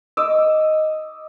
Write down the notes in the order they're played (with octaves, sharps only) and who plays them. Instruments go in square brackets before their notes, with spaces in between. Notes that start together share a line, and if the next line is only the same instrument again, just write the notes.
[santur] D#5 D6 E6